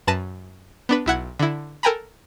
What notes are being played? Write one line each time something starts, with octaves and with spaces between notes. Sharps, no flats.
F#2 B4 A5 A#6 D#7
B3 D4 B4
B1 E4 F#5 G#6
D3 E4
A4 A#4 G5 G#5 A#5 B5